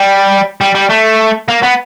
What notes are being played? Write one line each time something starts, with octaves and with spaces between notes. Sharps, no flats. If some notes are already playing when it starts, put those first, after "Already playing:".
Already playing: G3
G3
G3
A3
A#3
B3